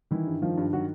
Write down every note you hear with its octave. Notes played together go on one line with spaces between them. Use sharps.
D#3 E3 E4
G2
D#3 F3 F4
G2
D#3 F#3 F#4